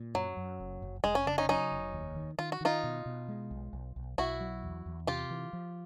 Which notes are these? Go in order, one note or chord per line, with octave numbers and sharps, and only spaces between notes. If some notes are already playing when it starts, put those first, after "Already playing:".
Already playing: A#2
F#2 F#3
F#2
F#1
F#1
F1 G#3
C#4
C#3 D4
C#4 D#4
F#3 C#4 D#4
F1
D#2
D#3
D#3 F4
F#4
D#3 D#4 F4
B2
B2
G#3
B1
B1
B1
B1 E4 F#4
F#3
E2
E2
C3 F4 G4
E3
F3